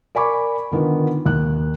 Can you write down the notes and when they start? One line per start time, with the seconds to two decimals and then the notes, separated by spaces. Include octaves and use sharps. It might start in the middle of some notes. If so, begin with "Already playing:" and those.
0.15 A#4 D5 G#5 B5 C#6 D6
0.71 D3 D#3 B3 F4
1.26 D#2 F#6